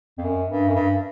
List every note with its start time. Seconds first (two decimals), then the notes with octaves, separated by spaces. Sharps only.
0.18 F2
0.24 F#2
0.49 G2
0.69 F#2
0.74 G2